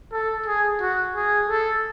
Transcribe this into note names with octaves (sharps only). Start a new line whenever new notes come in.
A4
G#4
F#4
G#4
A4